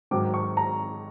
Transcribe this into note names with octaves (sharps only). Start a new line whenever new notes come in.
G#2 D#3 F#3 D6
C#6
A#5